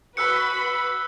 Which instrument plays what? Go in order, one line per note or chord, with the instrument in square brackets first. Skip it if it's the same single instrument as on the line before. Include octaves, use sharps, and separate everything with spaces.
[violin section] F#4 B4 B5 [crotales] E6 F#6 C#7